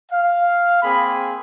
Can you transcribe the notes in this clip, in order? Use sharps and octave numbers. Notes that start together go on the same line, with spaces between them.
F5
A#3 C4 G#4 B5